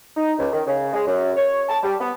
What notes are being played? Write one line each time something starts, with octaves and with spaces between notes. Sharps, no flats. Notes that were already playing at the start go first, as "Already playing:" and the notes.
D#4
C#2
D#3
C#3
G#3
F#2
C#5
A5
G3
B3